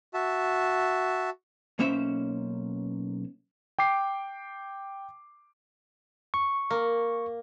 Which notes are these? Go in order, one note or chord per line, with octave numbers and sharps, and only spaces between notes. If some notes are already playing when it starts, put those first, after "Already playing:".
F#4 E5 A5
B1 A#3 C#4 C5 E5
G5 D6 C7
C#6
A#3